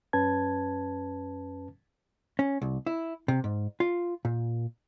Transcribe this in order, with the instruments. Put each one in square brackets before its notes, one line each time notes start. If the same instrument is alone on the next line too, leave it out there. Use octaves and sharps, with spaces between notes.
[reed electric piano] F#2 C#4 B4 A5 G#6
[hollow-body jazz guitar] C#4
C2
E4
C3
G#2
F4
A#2